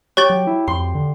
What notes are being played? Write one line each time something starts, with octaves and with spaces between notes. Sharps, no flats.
G4 C#5 C#6 A6
F#3
E4
F2 C6
D3